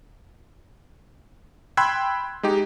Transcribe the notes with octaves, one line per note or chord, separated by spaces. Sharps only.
G5 B5 C6 E6 F#6 G#6
G#3 D#4 G4